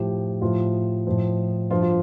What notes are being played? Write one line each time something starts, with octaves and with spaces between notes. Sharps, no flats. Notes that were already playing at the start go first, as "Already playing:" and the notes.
Already playing: A2 F3 G4
A2 F3 F4
A2 F3
G2 F3 F4
F4